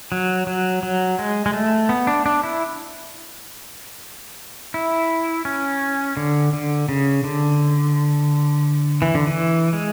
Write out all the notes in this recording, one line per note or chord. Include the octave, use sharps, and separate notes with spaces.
F#3
F#3
F#3
G#3
G#3
A3
B3
D4
D4
E4
E4
C#4
D3
D3
C#3
D3
E3
D3
E3
G#3